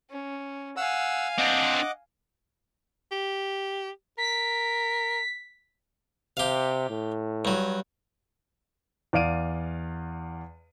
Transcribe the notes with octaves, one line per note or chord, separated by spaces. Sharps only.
C#4
F5 F#5 G#5 E6
C4 D4 D#5 F#5 D6
G4
A#4 B6
C3 G4 F5
A2
G2 F#3
E2 D5 F5 D7 D#7